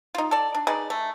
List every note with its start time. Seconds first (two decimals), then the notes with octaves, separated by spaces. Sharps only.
0.15 D#4 F4
0.31 A4 D5
0.54 D4
0.67 D#4 G#4 B4 D5
0.90 A3